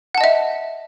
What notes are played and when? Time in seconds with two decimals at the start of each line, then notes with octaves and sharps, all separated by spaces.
0.15 F#5
0.18 A5
0.21 D#5
0.24 E5